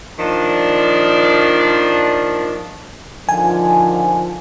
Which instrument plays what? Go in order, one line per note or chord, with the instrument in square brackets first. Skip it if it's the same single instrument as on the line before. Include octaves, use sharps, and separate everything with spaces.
[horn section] A#2 D#3 F3 D4
[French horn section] D3 D#3 F3 [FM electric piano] G#5